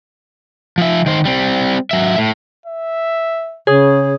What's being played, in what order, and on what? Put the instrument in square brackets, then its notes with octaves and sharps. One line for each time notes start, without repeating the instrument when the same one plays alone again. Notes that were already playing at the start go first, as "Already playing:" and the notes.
[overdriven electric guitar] F3 E5
D#3 C5
G3 C4
F#3 E5
A2
[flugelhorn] E5
[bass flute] C#3 [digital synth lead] G#4 [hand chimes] C#5 D#6